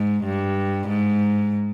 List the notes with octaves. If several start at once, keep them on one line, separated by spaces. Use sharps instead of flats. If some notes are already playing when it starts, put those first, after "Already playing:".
Already playing: G#2
G2
G#2